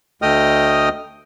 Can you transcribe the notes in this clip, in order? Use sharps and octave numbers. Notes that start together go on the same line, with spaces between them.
D2 A3 D#5 G5 D#6 F6